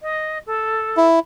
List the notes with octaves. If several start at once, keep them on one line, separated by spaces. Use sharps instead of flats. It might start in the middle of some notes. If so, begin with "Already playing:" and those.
D#5
A4
E4